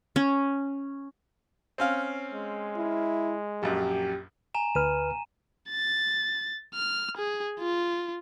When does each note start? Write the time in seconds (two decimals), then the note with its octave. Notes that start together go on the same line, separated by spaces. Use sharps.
0.16 C#4
1.78 C4 C#4 F5
2.32 G#3
2.76 E4
3.63 A#1 F#2 G4
4.54 G#5 A#5 E7
4.75 D2 B4 F6 D#7
5.70 A6
6.74 F6
7.17 G#4
7.60 F4